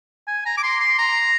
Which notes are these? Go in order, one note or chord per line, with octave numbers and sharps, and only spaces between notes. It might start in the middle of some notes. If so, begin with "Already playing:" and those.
G#5
A#5
D6
C6
C6
A#5